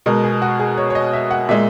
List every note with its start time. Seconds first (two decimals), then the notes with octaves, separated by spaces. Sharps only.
0.06 B2 G#3 A#4
0.24 G#4
0.42 F#4
0.60 G#4
0.77 C#5
0.90 C#5
0.95 D#5
1.13 E5
1.31 F#5
1.49 A#2 G#3 E5